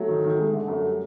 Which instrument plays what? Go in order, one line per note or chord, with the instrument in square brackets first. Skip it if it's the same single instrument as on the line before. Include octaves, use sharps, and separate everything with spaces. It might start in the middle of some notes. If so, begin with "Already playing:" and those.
Already playing: [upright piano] F#3 [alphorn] A3
[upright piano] D#3
D#3
G#3
[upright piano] D3 [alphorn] A3
[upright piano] F#2
G3